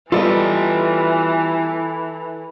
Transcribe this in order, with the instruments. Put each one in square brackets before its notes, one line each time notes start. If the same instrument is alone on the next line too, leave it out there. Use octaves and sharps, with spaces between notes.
[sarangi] E3 [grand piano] G3 B3 [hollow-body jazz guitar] F4 D5 D#5 [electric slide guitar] A4 B4